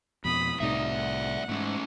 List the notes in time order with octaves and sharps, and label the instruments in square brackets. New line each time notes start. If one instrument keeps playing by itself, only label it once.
[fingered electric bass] F2 B2 [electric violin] B5 D#6
[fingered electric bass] C2 A2 C3 [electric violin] D#4 [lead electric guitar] D5 E5
[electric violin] F#5
[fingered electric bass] G#2 [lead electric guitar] A3 C#4